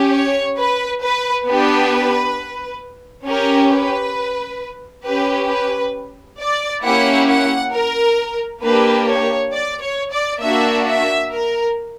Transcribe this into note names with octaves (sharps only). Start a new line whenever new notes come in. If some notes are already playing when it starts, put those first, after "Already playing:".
Already playing: C#4 G4
C#5
B4
B4
B3 D4 G4 B4
C#4 G4 A#4
B4
C#4 G4 B4
B4
D5
A#3 C#4 E4 G4 F#5
F#5
A#4
A#3 D4 G4 B4
C#5
D5
C#5
D5
A#3 D4 F#4 E5
E5
A#4